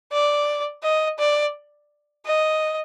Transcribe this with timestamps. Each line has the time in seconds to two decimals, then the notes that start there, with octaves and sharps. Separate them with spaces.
0.12 D5
0.83 D#5
1.18 D5
2.26 D#5